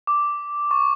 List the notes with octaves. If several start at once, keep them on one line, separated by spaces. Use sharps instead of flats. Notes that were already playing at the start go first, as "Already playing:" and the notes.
D6
C#6